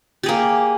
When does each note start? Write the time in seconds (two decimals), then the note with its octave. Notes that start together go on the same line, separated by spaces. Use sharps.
0.23 G4
0.26 G#4
0.29 A#3